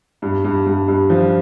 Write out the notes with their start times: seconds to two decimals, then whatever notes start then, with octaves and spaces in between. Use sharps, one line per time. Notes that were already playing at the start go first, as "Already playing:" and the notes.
0.22 G2
0.45 G2
0.66 G2
0.88 G2
1.10 F3